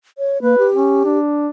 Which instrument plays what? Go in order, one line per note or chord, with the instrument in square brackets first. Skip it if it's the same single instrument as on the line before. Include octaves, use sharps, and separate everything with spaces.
[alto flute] C#5
[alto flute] A#3 [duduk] B4
[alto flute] G4
[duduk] C#4
D4